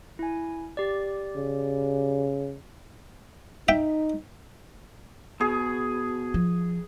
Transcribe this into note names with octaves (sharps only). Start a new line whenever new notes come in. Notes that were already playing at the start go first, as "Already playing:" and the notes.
E4 G#5
G4 D5
C#3
D#4 E5 G5
B2 G#4
F3